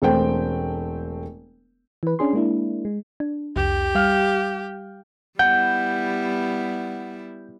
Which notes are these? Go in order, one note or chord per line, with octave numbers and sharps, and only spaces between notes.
E1 A3 C4 G5
E3 B4
C#4 D4 G#4 C6
G#3 A#3 D4 E4
G#3
D4
C2 F2 G4
G3 F5 F6
G3 B3 E4 F#5 G6